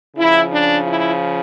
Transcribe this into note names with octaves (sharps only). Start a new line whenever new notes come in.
C#3 F3 E4
D4
E4